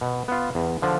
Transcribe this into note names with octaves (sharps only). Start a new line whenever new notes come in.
B2
B3 F4
E2
D3 F3